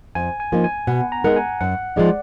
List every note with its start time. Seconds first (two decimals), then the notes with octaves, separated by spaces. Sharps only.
0.15 F2 G#5
0.40 G#5
0.52 F3 A#3 D#4
0.64 G#5
0.87 B2 F#5
1.12 A#5
1.24 G#3 B3 D#4 A#4 F#5
1.36 G#5
1.61 F#2 F#5
1.96 F3 G#3 D#4 D5